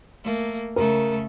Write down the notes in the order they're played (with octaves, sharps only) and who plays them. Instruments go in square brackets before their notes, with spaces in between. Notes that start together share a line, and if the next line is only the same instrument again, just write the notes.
[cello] A3 A#3
[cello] C#3 A3 [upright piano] A#4